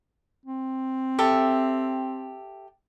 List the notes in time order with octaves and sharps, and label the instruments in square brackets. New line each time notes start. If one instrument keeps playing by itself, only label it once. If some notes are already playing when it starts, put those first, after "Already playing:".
[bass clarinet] C4
[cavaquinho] G4 A4 E5